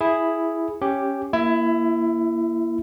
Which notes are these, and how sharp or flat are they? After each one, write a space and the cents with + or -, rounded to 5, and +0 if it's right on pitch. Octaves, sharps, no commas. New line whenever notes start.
E4 +0 G#4 +0
C#4 -5 G4 +0
A#3 +10 E4 +20 E5 -25